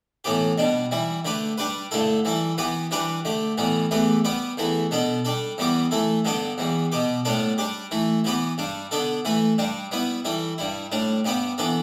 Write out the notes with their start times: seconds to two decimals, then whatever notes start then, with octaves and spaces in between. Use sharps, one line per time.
0.24 A2 E3 B3 G4
0.58 B2 G3 D4
0.91 E3 G3 E4
1.25 D3 A3 G4 B4
1.58 G3 D4 G4 B4
1.91 G2 D3 A3 E4 A4
2.25 E3 G3 E4 A4
2.58 E3 B3 G4 B4
2.91 E3 G3 D4 G4 B4
3.25 D3 A3 G4
3.58 A2 E3 G3 B3
3.91 E2 E3 A3 G4 B4
4.25 G3 B3 G4 B4
4.57 E2 E3 A3 E4
4.91 B2 B3 D4 A4
5.25 G3 D4 A4
5.58 E2 E3 G3 B3 G4
5.91 E3 A3 E4 A4
6.25 G2 D3 B3 D4 A4
6.58 E2 E3 G3
6.92 B2 B3 G4
7.25 A2 G3 B3 D4 A4
7.58 G3 D4 G4
7.91 E3 A3 E4
8.24 E3 B3 G4 B4
8.58 G2 G3 D4
8.91 D3 B3 D4 A4
9.25 E3 A3 E4 B4
9.58 G2 G3 D4
9.91 G3 B3 E4 B4
10.25 E3 G3 E4 A4
10.58 G2 G3 E4
10.92 A2 G3 D4
11.25 G2 G3 B3 G4 B4
11.58 E3 B3 D4 A4